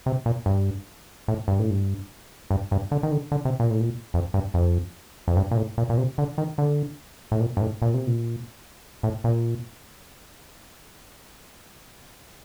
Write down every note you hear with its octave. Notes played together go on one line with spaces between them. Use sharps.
C3
A#2
G2
A2
G2
A2
G2
G2
G2
D3
D#3
D3
D3
C3
A#2
A2
A#2
F2
G2
F2
F2
G2
A#2
A2
A#2
A#2
C3
D3
D#3
D3
A2
A#2
G2
A2
A#2
C3
A#2
A2
A#2